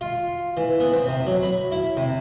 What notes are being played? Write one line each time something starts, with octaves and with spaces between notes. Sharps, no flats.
F4
E3
B3
C4
C3
F#3
B5
E4
C3